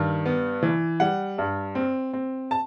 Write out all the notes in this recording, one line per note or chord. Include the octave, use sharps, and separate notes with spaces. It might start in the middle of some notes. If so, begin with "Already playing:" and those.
Already playing: G2 D#3
B3
E3
G3 F#5
G2
C4
C4
A5